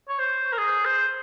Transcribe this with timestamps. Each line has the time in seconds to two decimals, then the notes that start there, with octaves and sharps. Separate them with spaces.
0.09 C#5
0.19 C5
0.53 A#4
0.58 G#4
0.85 C5